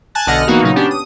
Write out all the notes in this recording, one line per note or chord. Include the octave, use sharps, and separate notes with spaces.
G#5 A5 F#6 A6
B1 D3 D#5 F#5 F6 A#6
E3 A#3 B3 D#4 F#4
A#2 C#3 F#3 D#4
B3 C#4 D4 G4
D#6